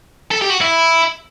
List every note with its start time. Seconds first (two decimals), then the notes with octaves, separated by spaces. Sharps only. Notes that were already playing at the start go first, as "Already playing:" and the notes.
0.31 A4
0.42 G4
0.51 F#4
0.61 E4